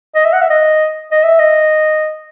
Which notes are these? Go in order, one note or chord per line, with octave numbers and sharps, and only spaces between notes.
D#5
E5
F#5
E5
D#5
D#5
E5
D#5